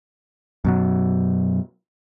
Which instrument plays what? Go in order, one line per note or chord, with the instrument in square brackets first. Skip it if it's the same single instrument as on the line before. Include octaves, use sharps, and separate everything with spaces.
[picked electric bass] F#2 B2 F#3